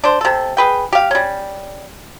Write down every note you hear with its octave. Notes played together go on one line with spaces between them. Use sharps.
D4 C5
C3 A4
G#4 B4 G5
G4 F5
G3 C#4